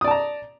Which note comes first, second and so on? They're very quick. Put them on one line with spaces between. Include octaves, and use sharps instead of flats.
D#6 D5 A5 A#5